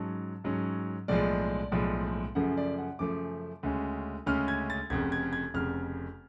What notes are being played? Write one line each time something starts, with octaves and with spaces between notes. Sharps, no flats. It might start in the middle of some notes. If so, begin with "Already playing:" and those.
Already playing: G#2 F#3 C#4 A5
G#2 F#3 C#4
B1 A2 F3 G#3 D5
B1 A2 F3 G#3
F#2 C#3 F3 A3 F#5
D5
F#5
F#2 C#3 F3 A3 D6
D2 C#3 G#3 C#4
D2 C#3 G#3 C#4 F6
G#6
A6
F1 F2 C#3 G#6
G#6
G#6
F1 F2 C#3 F6